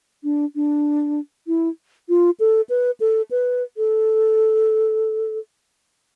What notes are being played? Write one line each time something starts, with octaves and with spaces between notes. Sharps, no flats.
D4
D4
E4
F4
A4
B4
A4
B4
A4